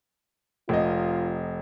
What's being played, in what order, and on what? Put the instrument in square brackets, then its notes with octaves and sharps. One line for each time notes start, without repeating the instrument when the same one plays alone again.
[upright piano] F1 D#5 [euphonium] F4